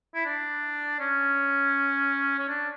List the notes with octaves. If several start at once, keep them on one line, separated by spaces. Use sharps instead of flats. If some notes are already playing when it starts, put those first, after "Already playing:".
E4
D4
C#4
C#4
D4